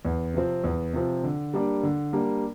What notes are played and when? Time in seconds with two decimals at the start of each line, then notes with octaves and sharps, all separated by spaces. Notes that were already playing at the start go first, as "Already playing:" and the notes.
0.05 E2
0.34 C3 F3 C4
0.64 E2
0.93 C3 F3 C4
1.24 D3
1.54 G3 A#3 D4
1.83 D3
2.13 G3 A#3 D4